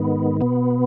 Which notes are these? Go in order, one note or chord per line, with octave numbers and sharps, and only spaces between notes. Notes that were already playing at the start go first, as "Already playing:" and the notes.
Already playing: G#2 D#3 B3
B2 B3